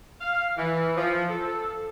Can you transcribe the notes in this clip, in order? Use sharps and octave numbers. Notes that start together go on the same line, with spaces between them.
F5
E3
F3
A4